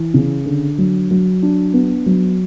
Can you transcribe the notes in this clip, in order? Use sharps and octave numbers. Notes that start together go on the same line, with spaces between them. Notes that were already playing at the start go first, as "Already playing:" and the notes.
Already playing: E3
C#3
D3
F#3
F#3
D4
B3
F#3